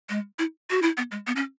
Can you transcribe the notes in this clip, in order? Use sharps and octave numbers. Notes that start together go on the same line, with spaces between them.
G#3
E4
F#4
E4
B3
G#3
B3
C#4